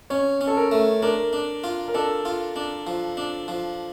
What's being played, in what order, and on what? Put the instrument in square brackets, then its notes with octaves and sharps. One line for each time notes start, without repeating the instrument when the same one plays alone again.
[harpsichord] C#4 [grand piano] C#5
[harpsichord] C#4
[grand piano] A4
A#4
[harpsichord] A3
[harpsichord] D4 [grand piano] A#4
[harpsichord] D4
F4
[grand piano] A#4
[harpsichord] D4 [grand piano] A4
[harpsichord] F4
D4
F3
D4
F3